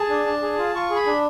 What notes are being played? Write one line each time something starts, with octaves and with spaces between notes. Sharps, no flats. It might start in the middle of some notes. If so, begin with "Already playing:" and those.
Already playing: G#4 A5
D4
D4
G#4
F4
F4 C#6
G#4
B5
D4